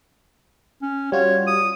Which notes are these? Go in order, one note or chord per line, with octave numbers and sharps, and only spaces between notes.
C#4
G3 F4 F#4 C#5
D#6